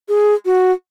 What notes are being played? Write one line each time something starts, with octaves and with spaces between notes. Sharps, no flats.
G#4
F#4